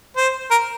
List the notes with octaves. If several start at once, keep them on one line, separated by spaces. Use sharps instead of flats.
C5
A#4